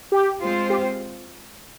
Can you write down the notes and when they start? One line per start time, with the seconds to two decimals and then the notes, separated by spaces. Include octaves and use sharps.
0.12 G4
0.41 G#3 C4 F4 C5
0.70 G4